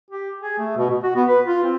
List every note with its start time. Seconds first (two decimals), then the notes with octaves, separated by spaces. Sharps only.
0.10 G4
0.41 G#4
0.59 A3
0.77 B2
0.90 B2
1.03 F#4
1.16 B3
1.28 B4
1.47 F4
1.64 C4